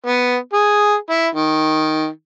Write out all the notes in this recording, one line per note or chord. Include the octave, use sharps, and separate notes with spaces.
B3
G#4
E4
D#3